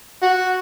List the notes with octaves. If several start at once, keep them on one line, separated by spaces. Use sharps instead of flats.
F#4